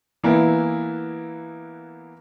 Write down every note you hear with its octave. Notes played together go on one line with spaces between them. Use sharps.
E3 A#3 B3 E4